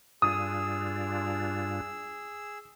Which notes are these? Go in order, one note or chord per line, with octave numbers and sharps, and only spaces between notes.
G2 D4 F4 G#4 D#6 E6